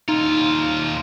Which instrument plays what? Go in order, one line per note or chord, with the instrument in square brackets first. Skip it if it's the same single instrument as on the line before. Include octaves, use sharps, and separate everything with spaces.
[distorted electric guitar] D#2 F4 [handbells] D#4